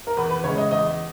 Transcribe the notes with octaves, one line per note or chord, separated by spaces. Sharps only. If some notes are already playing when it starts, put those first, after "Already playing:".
A#4
E2 B4
B4
C#3 G#3 C#5
D#5
E2 D#5